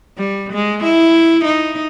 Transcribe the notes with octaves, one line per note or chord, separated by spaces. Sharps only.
G3
G#3
E4
D#4